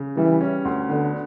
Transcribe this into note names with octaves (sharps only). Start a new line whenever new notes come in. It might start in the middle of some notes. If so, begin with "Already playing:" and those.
Already playing: C#3
E3 G3
C#4
D2
D3 B3